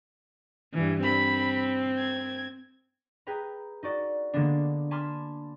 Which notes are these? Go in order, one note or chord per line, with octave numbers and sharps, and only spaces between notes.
G2 E3
C4 B5
G#6
G#4 B4 G5 A#5
D#4 F#4 D5
D3 G#3 A#3 B3 D4
G#5 A5 B5 C6 D6 F6